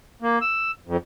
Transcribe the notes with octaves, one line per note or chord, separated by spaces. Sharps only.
A#3
E6
F2